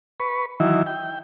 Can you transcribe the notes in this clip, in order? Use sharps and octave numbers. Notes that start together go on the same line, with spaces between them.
B4 C#6
D#3 E3 F#3 E4
G5